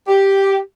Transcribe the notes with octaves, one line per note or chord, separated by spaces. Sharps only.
G4